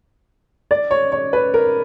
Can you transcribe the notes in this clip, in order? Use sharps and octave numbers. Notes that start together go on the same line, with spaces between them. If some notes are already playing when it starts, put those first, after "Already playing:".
D5
C#5
C#5
B4
A#4